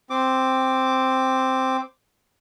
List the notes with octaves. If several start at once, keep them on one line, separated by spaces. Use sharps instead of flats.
C4 D6